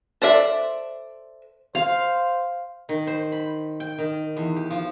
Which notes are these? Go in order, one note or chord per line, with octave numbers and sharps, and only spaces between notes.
A4 C5 D5 E5
C5 F5
D#3
C5
B5
G5
D#3
E2
G4
F3